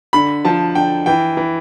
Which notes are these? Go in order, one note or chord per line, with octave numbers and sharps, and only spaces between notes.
D3 B5
F3 A5
D3 G5
E3 G5
E3